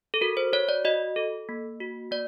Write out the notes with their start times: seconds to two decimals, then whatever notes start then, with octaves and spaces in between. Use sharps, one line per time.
0.14 A4
0.21 F#4 A#4
0.37 C5
0.53 F#4 C#5
0.69 D5
0.84 F#4 D#5
1.16 A4
1.49 A#3
1.80 F#4
2.11 A#3 D5